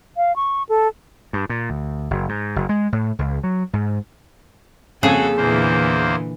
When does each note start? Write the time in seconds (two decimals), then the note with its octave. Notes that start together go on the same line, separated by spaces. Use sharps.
0.17 F5
0.36 C#6
0.69 A4
1.33 G2
1.49 A#2
1.70 D2
2.10 F#1
2.29 G#2
2.56 F#1
2.69 G#3
2.92 A2
3.19 C#2
3.43 F#3
3.73 G#2
5.03 F2 C#3 A#3 F#4 G#4 A4
5.37 E2 A#2 D3 E3 A#3 C5